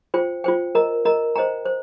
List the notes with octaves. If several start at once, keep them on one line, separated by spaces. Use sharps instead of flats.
F4 C5 G5
F4 C5 G5
A#4 D#5 A#5
A#4 D#5 A#5
C5 D#5 G5 A#5
C5